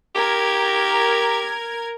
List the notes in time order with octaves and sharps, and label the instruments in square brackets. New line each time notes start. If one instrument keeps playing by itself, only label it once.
[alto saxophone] G4 [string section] A#4 G#6